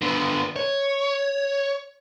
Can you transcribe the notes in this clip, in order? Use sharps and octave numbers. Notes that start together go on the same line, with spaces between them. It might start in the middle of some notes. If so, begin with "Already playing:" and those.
D3 B3
C#5